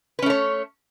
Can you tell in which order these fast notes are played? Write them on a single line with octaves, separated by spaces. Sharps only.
B4 C#4 A3 C#5